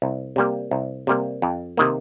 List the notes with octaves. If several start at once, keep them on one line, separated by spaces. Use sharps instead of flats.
C2
C3 G3 A#3
C2
C3 G3 A#3
F2
C3 D#3 A#3